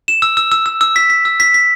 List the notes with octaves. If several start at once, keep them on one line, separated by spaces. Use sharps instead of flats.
E7
E6
E6
E6
E6
E6
B6
B6
E6
B6
B6